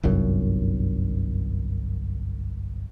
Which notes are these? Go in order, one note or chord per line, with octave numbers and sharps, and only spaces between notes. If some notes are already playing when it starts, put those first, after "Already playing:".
G1 C2 F#2